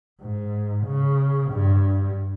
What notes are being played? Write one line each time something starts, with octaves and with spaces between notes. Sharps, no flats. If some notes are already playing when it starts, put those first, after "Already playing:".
G#2
C#3
G2